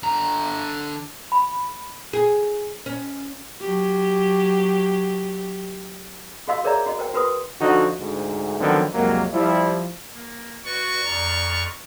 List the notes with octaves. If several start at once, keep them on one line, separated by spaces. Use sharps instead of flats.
D3 A#5
B5
G#4
C#4
F#3 G4
F#4 G4 D#5 F5 C6 E6
G#4 A#4 C#5 D5 E5 A#5
F#4 D#5
A#4 C5 G5
F#4 A#4 B4 C6 D#6
D3 F3 D#4 F#4
D2 G#2
D3 D#3 F3 F#3 B3 C4
C2 F2 F#3 G#3 A#3
F3 G3 E4
A#3
F#4 B4 D5 C#6
F2 D5 A#5